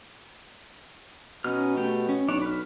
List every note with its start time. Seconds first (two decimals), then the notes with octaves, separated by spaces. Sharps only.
1.44 B2 C#4 D#4 F6
1.77 A3 G4 G5
2.09 C#4
2.28 B1 D4 C#5 D5
2.42 B4 F6